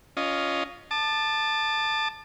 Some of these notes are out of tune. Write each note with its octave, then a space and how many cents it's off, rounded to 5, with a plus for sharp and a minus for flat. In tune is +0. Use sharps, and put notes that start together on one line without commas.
C#4 +20 F4 +0 D#5 -5
A5 +0 D6 +40